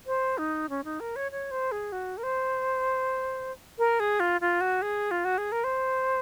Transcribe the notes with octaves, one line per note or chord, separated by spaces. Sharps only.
C5
D#4
C#4
D#4
A#4
C#5
C#5
C5
G#4
F#4
A#4
C5
A#4
G#4
F4
F4
F#4
G#4
F4
F#4
G#4
A#4
C5